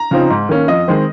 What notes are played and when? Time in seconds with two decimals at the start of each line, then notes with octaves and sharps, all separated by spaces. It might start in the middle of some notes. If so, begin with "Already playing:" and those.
Already playing: A#5
0.11 C#3 F3 C4 D#4
0.30 G#2
0.49 D#3 A#3 C#4
0.68 F2 D#5
0.88 D#3 G#3 C4